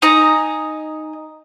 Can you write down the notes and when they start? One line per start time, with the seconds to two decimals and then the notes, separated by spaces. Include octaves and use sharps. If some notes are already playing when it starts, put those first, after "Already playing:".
0.02 D#4 G#5 A#5